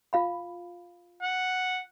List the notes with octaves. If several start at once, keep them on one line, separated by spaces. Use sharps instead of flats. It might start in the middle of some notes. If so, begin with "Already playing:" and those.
F4 F5 B5
F#5